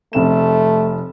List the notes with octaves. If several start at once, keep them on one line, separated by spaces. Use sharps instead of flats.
F1 A3 C4 E7